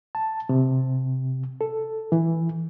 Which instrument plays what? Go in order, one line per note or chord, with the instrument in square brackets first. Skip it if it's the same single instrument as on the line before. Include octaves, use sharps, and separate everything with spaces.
[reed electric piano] A5
C3
A4
E3